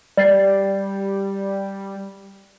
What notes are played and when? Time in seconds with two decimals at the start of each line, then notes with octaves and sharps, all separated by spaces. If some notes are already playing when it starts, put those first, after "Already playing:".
0.17 G3 D5 A6 C7